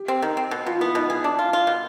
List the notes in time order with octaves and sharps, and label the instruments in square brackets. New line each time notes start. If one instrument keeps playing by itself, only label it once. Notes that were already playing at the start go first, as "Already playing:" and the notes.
Already playing: [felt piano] G4
[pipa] C4
D#3
C4
B2
[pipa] B2 [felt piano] F4
[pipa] B3 [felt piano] E4
[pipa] B2 [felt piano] D#4
[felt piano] E4 [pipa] G#4
[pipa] D4
F4
F4
B2